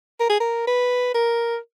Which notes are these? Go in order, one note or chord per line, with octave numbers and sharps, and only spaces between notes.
A#4
G#4
A#4
B4
A#4